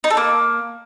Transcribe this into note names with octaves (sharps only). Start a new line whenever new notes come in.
D#4
A4
A#3